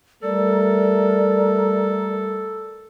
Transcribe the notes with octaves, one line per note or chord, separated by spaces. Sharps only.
G3 A3 A4 A#4 D5